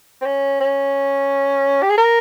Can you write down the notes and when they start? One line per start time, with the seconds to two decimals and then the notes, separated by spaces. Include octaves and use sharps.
0.21 C4
0.26 C#4
0.60 C#4
1.82 G4
1.90 G#4
1.98 A#4